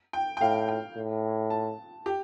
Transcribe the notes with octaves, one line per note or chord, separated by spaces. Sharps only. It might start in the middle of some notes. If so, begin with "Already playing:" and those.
G5
G5
A2 F5
G5
A2
A5
G4